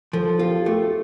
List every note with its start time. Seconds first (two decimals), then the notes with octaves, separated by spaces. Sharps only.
0.13 F3 A4
0.39 F4 G4
0.66 A3 G4